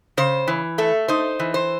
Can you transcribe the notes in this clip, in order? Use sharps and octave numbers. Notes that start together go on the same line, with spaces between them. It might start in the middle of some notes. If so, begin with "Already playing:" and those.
C#3 C5
E3
A3 A4
D#4 C5
E3
C5